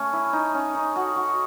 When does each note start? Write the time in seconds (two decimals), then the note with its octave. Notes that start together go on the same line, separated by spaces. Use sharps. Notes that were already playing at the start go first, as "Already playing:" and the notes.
Already playing: A3 C#4
0.13 E4
0.33 D#4
0.54 C#4
0.75 D#4
0.96 F#4
1.16 F#4